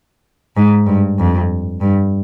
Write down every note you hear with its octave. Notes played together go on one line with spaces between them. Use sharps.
G#2
G2
F2
G2